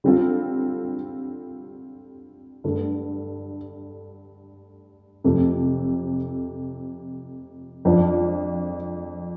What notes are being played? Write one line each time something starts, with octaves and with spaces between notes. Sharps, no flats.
D3 G3 C4 F4 A4
G2 D3 A3
F2 C3 A3
F2 F3 D4 F4